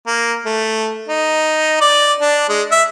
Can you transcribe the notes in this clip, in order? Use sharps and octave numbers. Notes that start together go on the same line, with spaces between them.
A#3
A3
D#4
D5
D4
G#3
E5